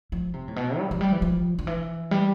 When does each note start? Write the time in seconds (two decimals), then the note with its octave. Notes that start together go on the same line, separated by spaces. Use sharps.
0.12 F3
0.34 C3
0.48 A2
0.56 B2
0.78 G3
0.91 F3
1.01 G3
1.12 E3
1.22 F3
1.59 D3
1.67 E3
2.11 G3